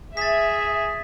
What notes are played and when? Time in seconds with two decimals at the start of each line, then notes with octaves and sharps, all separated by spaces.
0.17 G#4 E5 A6 B6